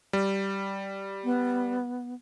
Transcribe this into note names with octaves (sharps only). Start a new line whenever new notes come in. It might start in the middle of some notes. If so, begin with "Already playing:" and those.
G3
B3